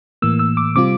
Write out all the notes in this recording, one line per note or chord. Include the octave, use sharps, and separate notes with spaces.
A2 E3 A#3 E6
E6
D6
C3 G3 C4 F4 D6